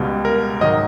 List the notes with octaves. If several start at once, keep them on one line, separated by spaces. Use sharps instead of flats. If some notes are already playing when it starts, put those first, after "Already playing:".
Already playing: C#2 B2 G3
A#4
G#2 D#3 F#3 D#5